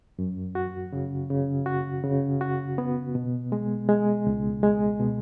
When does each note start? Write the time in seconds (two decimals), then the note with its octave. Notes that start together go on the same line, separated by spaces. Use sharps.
0.19 F#2
0.55 F#4
0.93 C#3
1.30 C#3
1.66 F#4
2.04 C#3
2.41 F#4
2.78 B3
3.15 B2
3.52 G#3
3.89 G#3
4.27 C#2
4.63 G#3
5.00 B2